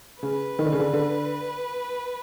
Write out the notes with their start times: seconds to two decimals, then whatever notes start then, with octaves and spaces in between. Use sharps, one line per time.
0.23 C#3 B4
0.59 D#3
0.65 D3
0.72 C#3
0.80 D3
0.93 D3